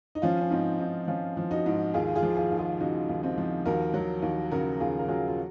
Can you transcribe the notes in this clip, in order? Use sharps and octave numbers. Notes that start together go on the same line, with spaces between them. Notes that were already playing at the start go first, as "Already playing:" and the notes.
D#4
F3 C#4 F4
C#4
G#2 C4 D#4
G#2 C4 D#4
F3 C#4 F4
F3
D#4 F#4
G#2
D#2 F4 G#4
F4 G#4
F3
F4 G#4
D#2
F4 G#4
C#3 D#4 F#4
D#2
C4 D#4
F3
D#2 F#4 A#4
F#3
D#2
C#3 F#4 A#4
D#2 F4 G#4
A#4
F#3 F4 G#4
F4